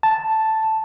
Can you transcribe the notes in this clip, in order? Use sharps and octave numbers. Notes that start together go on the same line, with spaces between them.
A5